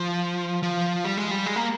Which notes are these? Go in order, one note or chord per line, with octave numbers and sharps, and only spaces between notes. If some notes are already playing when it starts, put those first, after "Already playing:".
Already playing: F3
F3
G3
G#3
G3
G#3
A#3